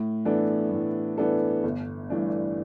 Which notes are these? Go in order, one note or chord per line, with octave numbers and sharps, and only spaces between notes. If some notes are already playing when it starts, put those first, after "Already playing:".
Already playing: A2
E3 B3 D4 A4
A2
E3 B3 D4 A4
G1
G2 E3 A3 D4